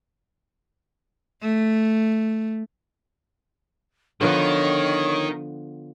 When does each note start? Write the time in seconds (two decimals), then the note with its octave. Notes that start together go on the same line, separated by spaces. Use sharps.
1.42 A3
4.21 D3 D#3 F3 B3 D#4 C#5